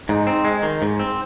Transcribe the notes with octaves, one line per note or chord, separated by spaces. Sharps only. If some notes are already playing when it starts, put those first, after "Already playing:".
G#2 D#4
C4
G#3
D#3
G#2
C4